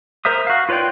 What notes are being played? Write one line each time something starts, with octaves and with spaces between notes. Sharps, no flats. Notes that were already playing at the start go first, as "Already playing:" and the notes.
A#4 C5 E5 D#6
F#4 F5
F4 B4 C#5 D5 G5